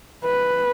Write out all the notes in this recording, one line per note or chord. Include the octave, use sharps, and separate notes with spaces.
B4